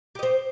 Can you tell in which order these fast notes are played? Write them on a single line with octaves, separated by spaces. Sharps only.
G4 D#5 C5